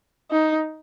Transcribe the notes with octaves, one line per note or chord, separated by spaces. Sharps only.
D#4